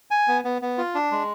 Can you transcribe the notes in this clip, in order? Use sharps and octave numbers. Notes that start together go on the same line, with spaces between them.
G#5
B3
B3
B3
F4
D4
G#3